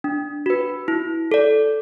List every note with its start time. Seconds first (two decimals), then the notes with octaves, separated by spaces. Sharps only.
0.04 D4
0.46 F#4 B4
0.88 E4
1.31 A4 D5